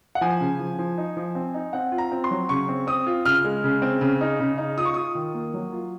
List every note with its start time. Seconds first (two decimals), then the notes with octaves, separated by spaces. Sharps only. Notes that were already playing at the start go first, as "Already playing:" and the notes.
0.15 F#5
0.21 F3 G#5
0.41 C#3
0.59 F3
0.79 F3
0.98 D#4
1.17 F3
1.35 C4
1.54 D#4
1.73 C4 F#5
1.92 F4
1.98 A#5
2.12 C4
2.24 C6
2.31 F#3
2.49 C#3 C#6
2.69 C4
2.87 C4 D#6
3.07 F4
3.25 C#3 F6
3.44 G#3
3.64 C#3
3.82 C4
4.01 C#3
4.21 D#4
4.40 C#3
4.58 D#4
4.78 F4 D#6
4.85 C#6
4.94 F4 D#6
5.15 D#3
5.34 A#3
5.54 F#3
5.72 F4